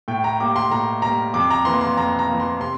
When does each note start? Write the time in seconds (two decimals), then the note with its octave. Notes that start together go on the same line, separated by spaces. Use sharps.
0.08 A2 G5
0.24 A#5
0.40 G3 A#3 D6
0.56 C6
0.71 A2 A#5
1.02 G3 A#3 A#5
1.34 F2 D6
1.51 A#5
1.65 E3 A#3 C6
1.81 C6
1.97 F2 A#5
2.19 A#5
2.29 E3 A#3
2.40 C6
2.60 C3 C6